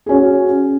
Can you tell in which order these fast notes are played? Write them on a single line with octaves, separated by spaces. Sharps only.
G#4 C#4 F#4